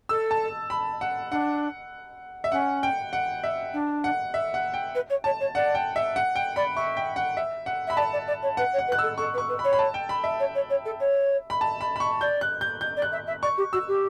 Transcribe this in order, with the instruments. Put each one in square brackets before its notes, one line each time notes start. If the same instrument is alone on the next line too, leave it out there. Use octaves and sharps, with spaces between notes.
[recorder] A4 [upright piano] E6
[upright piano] A5
B5
F#5
[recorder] D4 [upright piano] F#5
[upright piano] E5
[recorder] C#4 [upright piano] F#5
[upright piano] G5
F#5
E5
[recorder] D4
[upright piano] F#5
E5
F#5
G5
[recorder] B4
C#5
[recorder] C#5 [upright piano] A5
[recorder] C#5
[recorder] D5 [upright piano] F#5
[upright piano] G5
E5
F#5
G5
[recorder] D5 [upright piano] B5
[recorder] E5 [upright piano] C#6
[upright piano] G5
F#5
E5
F#5
[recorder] E5 [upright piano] B5
[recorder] D5 [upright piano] A5
[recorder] D5
D5
C#5
[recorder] B4 [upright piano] F#5
[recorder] C#5
[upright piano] F#5
[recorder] B4
[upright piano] F#6
[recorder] A4 [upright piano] E6
[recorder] A4 [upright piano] C#6
[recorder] B4
[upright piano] C#6
[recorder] B4
[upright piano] B5
[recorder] C#5
[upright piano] B5
A5
G5
B5
E5
[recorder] C#5
C#5
C#5
A4
C#5
[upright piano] B5
A5
B5
B5
C#6
[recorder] D5 [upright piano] G6
[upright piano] F#6
G6
G6
[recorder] D5
[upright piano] F#6
[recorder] E5
E5
[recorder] D5 [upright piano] C#6
[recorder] G4
[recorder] F#4 [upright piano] E6
[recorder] G4